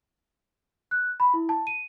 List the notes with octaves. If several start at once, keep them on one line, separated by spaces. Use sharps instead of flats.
F#6
B5
E4
A5
D#7